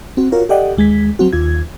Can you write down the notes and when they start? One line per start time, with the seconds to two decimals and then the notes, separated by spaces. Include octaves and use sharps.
0.17 C4 F#4
0.32 F4 F#4 A#4 C#5
0.49 G4 A4 D5 D#5 F#5 G5
0.77 D#2 G#3 G#6 B6
1.19 F#3 C4 F#4
1.33 D#2 F4 G#6